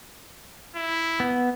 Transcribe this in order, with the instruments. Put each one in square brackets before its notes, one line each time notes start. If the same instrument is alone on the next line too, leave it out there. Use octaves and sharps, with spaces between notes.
[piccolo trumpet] E4
[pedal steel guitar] B3